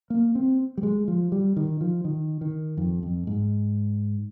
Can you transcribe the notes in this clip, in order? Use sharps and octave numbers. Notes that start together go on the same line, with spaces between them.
A#3
C4
G3
G#3
F3
G3
D#3
F3
D#3
D#3
F2
F2
G#2